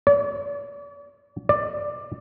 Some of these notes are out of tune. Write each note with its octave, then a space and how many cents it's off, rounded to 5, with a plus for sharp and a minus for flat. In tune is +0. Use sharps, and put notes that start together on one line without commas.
D5 -45
D5 +10